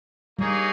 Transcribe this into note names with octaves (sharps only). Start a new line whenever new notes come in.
G3 A#3 D#4 G#4 C#5